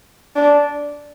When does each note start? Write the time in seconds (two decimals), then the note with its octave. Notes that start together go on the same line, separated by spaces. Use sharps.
0.36 D4